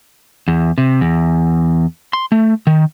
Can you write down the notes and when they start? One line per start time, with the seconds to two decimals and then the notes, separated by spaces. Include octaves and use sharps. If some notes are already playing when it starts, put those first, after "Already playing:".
0.48 E2
0.78 C3
1.01 E2
2.13 C6
2.32 A3
2.67 D#3